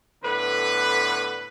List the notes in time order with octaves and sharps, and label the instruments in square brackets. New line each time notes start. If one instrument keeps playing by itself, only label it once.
[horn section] A2 D3 B3 B4